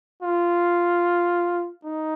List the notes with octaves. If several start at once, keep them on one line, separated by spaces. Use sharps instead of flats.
F4
D#4